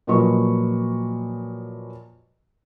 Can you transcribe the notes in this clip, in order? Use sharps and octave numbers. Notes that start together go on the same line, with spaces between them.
A#2 F3 F#3 B4 D#5 C#6